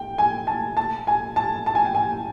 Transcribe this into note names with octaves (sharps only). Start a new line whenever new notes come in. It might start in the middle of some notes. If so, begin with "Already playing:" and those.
Already playing: G5
G#5
A5
A5
G#5
A5
A5
G#5
G5
G#5